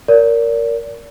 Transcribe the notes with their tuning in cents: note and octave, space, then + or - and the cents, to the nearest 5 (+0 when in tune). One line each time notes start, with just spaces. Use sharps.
A#4 +0 D5 -35